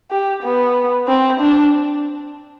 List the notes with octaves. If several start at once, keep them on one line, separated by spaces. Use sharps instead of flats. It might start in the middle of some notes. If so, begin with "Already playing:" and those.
G4
B3
C4
D4